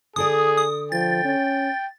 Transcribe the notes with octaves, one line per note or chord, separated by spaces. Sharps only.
D3 G#4 A4 D5 D#6
D#6
F3 G5 A6
C#4